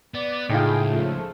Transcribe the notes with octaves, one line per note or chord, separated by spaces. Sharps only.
B3 D5
C#2 A2 D#4 F4 G#4 G5
C#3 F3 A3